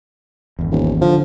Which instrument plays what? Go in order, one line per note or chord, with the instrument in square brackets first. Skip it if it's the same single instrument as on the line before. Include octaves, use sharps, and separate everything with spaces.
[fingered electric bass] G#1 E2
[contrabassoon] D#1
[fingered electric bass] D3 [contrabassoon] F3